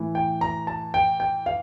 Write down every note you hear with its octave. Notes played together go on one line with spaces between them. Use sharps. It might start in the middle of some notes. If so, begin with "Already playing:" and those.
Already playing: A2 E3
G5
A#5
A5
G5
G5
F5